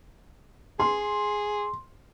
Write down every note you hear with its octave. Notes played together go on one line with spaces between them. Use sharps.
G#4 C6